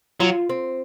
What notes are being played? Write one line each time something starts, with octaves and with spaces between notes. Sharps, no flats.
F#3 F4
C4